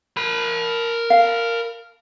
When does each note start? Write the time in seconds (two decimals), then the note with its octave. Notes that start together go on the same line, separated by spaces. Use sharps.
0.17 A#4 B5
1.10 F5